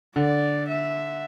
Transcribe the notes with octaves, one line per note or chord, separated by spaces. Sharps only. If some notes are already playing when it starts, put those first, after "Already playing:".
D3 D5
E5